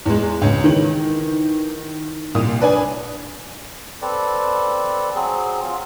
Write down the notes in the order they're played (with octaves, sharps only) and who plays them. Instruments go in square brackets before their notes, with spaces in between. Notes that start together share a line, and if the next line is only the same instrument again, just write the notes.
[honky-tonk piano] E2 G#3
C#2 C#4
D#3 E3 F#7
C2 A#2 D#6
D4 B4 D5 G#5
[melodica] C4 A4 B4 D5
F#3 C4 G#4
F4